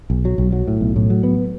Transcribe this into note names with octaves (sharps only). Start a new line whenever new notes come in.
B1
F#3
B1
F#3
A2
B1
A2
F#3
B3